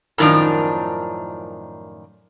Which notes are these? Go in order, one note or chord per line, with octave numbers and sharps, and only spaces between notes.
F#2 A2 D#3 F3 D4 D#4